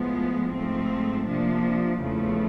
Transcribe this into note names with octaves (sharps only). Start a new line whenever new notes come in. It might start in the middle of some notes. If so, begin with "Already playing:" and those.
Already playing: A2 F3 G#3 B3
G#2 F3 A3 C4
C3 F3 A#3 D4
E2 C#3 F3 A3